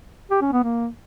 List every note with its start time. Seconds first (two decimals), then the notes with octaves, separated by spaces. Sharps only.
0.31 G4
0.42 C#4
0.52 B3
0.63 A#3